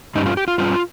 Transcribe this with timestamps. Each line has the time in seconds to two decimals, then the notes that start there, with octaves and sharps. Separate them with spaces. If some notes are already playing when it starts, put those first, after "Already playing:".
0.15 G2 G3 C#4 D#4
0.26 F4
0.37 G4
0.48 F4
0.58 G2 G3 C#4 F4